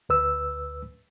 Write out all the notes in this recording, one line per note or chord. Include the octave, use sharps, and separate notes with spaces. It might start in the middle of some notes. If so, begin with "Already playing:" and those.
D2 B4 E6